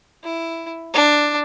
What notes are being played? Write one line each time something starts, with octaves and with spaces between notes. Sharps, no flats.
E4
D4